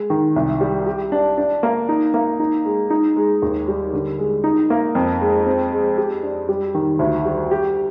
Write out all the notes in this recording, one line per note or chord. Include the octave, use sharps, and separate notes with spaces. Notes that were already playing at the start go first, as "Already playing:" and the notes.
Already playing: G#3
D#3
C2
G3
G4
D4
D4
A#3
D#4
A#3
D#4
G#3
D#4
G#3
D#2
G3
D3
G#3
D#4
A#3
F2
G#3
C4
G#3
G4
D4
G3
D#3
D2
G3
G4